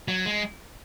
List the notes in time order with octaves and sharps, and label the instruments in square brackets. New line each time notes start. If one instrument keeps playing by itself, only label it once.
[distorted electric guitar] F#3
G#3